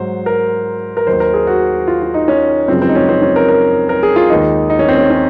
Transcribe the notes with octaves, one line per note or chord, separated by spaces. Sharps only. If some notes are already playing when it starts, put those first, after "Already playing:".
Already playing: G#2 F#3 C5
A#4
A#4
D#2 D#3 F#3 C5
A#4
G#4
F#4
F4
F4
D#4
C#4
F#2 C#3 F3 G#3 C4
C4
D#4
C#4
C4
C#4
A#4
A#4
A#4
G#4
F4
D#2 D#3 G#3 D#4
D#4
C#4
C4
C#4
C#4